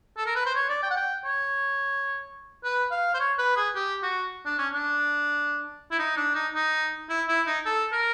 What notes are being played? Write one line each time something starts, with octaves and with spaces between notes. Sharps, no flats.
A4
A#4
B4
C5
C#5
D5
G5
F#5
G5
C#5
B4
F5
C5
C#5
B4
G#4
G4
F#4
D4
C#4
D4
E4
D#4
D4
D#4
D#4
E4
E4
D#4
A4
A#4